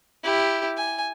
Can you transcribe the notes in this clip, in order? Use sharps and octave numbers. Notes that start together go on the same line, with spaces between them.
E4 G4
G#5